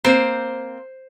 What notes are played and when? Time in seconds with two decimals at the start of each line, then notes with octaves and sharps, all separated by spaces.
0.05 A#3 C4 C5